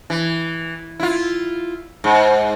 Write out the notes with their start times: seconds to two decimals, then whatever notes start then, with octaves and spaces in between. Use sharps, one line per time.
0.10 E3
1.00 E4 F4
2.04 G#2